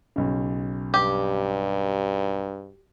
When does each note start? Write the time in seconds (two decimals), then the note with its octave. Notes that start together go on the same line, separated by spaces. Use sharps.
0.16 B1 C#3
0.94 G2 G4